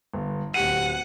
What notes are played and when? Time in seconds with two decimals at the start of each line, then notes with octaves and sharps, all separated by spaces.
0.14 G1
0.54 D1 G4 F#5 D#7